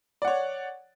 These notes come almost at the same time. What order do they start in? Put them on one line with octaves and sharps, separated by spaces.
D5 F#5 C#5